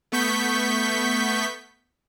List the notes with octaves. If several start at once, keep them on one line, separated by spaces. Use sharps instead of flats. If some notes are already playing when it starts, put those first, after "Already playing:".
A3 B3 C#6 G6 B6